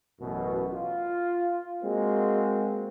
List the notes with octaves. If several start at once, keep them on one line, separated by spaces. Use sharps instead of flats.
A1 F#2 B2
F4
G#3 A#3 C4 F#4